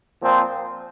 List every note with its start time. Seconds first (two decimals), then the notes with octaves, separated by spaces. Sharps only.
0.21 A#2 F3 C4